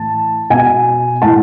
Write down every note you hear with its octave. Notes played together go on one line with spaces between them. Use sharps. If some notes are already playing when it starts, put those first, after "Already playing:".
Already playing: A2 E3 A5
B2 G#5
A2 E3 A5